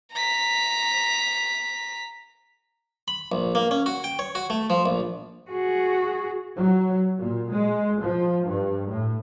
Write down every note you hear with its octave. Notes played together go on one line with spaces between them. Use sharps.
A#5 B6
B5
A#1
A#3
C#4
F#4
G5
C#5
F#4
A3
F3
A#1
F#4 G#4
F#3
A#2
G#3
F3
G2
A2